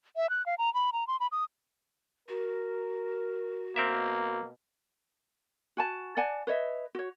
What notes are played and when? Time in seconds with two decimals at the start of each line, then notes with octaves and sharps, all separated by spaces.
0.16 E5
0.30 F#6
0.46 F5
0.58 A#5
0.74 B5
0.93 A#5
1.07 C6
1.20 B5
1.32 D#6
2.29 F#4 A#4
3.76 B2 A#3 C4 A#4 E5
5.77 F#4 G#5 A5
6.17 D5 F#5 G#5 A5
6.47 B4 C#5 D#5 E5
6.95 F#4 C#5